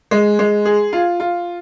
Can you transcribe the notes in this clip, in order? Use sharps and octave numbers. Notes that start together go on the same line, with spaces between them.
G#3
G#3
G#4
F4
F4